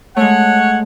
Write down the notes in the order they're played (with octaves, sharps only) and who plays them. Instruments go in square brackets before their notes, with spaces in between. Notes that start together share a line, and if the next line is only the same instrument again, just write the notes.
[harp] G#3 A3 [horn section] C#5 F#5